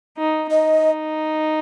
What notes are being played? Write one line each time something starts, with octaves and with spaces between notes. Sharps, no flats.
D#4
D#4 D#5